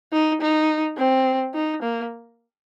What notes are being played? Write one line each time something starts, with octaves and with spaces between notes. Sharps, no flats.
D#4
D#4
C4
D#4
A#3